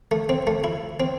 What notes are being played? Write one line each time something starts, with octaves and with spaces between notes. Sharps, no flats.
A3
C4
A3
E4
C4